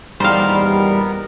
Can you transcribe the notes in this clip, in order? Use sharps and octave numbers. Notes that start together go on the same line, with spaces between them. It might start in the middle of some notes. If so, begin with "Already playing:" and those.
E2 A#2 D#3 G3 B3 A#4 C5 F5